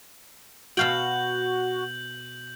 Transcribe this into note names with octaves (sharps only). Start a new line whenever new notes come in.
B2 F#4 F5 G5 G6 F#7